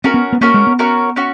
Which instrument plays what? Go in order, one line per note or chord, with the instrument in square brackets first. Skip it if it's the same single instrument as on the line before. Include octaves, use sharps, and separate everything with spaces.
[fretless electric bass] C4 [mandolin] C#4 F#4 A#4
[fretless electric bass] B3
B3
[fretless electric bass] A#3 [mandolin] C#4 F#4 A#4
[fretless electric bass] G#3
B3
[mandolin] C#4 F#4 A#4
C#4 F#4